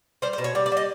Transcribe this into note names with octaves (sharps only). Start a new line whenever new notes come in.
G3 C5
C5
B2
C#5
G3 D5
D5
G3
D#5